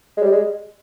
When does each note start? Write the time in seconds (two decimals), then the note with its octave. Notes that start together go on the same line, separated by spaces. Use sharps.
0.17 G#3
0.22 G3
0.32 G#3